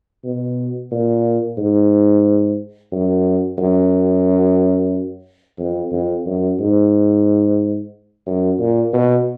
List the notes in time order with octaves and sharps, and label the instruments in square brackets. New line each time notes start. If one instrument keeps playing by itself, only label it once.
[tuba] B2
A#2
G#2
F#2
F#2
F2
F2
F#2
G#2
F#2
A#2
B2